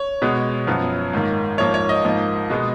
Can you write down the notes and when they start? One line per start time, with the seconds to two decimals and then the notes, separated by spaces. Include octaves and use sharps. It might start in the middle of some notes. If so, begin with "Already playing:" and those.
Already playing: C#5
0.22 B2 G#3 B3
0.67 F#2 F3 B3
1.13 G#2 D#3 A#3
1.58 G#2 F3 A#3 C#5
1.74 C#5
1.89 D#5
2.04 G#2 F3 A#3
2.50 B2 G#3 B3